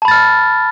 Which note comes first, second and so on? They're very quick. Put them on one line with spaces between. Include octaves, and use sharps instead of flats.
A5 B5 A6 F6